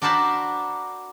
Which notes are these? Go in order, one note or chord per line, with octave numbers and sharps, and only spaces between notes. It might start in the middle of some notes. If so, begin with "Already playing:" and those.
D4 F#4 A#4 C5 A5 B5